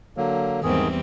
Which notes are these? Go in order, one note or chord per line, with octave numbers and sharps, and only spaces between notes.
D3 F#3 A#3
E2 G#2 D#3 G3 C4 G#4